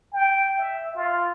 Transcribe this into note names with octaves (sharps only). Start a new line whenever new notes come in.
G5
E5
F4